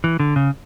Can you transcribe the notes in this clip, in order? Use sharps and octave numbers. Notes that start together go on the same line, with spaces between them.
E3
D3
C#3